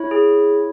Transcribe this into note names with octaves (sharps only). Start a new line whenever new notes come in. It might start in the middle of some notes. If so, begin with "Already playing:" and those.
Already playing: E4 C#5
G#4